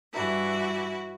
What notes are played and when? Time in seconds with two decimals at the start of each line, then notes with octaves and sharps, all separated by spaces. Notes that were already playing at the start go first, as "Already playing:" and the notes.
0.12 G2 E3 E4 F#4